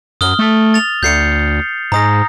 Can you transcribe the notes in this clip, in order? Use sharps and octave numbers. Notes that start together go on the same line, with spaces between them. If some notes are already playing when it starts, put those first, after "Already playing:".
F#2 D#6 F6 G7
A3
A6 F7
D2 G6 C7 C#7
G#2 A#5 D#6 A#6